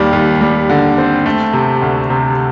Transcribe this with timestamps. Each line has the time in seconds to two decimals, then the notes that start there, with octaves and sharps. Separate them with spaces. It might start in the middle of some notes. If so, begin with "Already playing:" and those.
Already playing: D#2 G3
0.13 D#2
0.41 G3
0.69 D3
0.98 C4
1.26 A3
1.53 C3
1.82 D2
2.10 C3